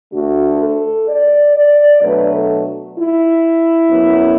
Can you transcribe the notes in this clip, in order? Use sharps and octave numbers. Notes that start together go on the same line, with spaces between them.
D2 D3 A3 F#4
A4
D5
D5
B2 F#3 A3 D4 B4
A4
E4
F#2 F#3 B3